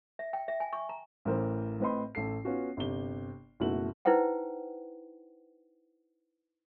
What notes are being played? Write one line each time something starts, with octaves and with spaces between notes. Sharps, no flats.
E5
G5
E5
G#5
C#6
A#5
A1 A2 E3 A#4 C5
A2 C4 B4 D#5 B5 C6
A1 A4 C7
B3 C#4 F4 F#4
G1 C3 G7
F#1 B2 A3 E4 F#4 F#7
D#4 E4 B4 C5 F#5 G5